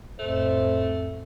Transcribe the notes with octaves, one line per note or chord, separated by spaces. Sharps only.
F2 A2 A3 C5